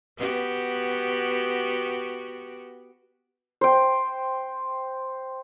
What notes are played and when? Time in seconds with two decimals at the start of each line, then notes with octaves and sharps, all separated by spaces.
0.17 B3 F#4 G4
3.61 C5 G5